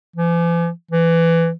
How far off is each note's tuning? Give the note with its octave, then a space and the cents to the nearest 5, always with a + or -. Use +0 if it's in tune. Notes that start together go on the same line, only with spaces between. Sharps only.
E3 +45
E3 +15